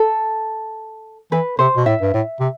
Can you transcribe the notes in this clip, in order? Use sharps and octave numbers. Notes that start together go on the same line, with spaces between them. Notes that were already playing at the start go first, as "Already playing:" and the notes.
Already playing: A4
E3 B4
C3 C5
B2
A2 E5
G2
A2
C3